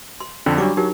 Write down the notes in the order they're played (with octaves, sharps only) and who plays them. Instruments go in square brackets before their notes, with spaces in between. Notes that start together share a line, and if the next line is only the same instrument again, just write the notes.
[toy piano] C6
[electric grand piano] F2 D3 [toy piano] C#4
[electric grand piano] F#3 G3 [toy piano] D4 C#6 D6
[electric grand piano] F#3 [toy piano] D#4 G4 A#4